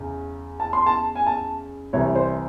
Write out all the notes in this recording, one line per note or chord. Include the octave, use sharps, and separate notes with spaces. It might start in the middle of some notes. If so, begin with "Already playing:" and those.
Already playing: E2 C#3
A5
C6
A5
G#5
A5
C2 C3 E3 C#5
C5